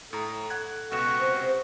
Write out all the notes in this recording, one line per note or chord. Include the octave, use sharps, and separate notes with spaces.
A2 A4 A#5
F#5 F#6 G#6
C#2 B2 F#4 E7
C3 C5